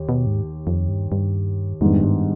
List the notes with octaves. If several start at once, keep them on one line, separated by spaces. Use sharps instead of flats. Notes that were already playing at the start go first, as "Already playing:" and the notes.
Already playing: D#2 G4
B2
G#2
F2
G2
G2
F2 G#2 D#3 G3 B3 D4
G2